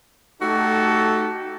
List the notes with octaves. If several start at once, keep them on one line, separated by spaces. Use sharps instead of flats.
A3 D#4 F#4 G4 A4